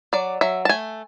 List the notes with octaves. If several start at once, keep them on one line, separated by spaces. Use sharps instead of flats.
F#3 D5
F#3 E5
A5
A3 G#5